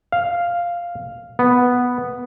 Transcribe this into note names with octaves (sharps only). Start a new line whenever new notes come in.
F5
B3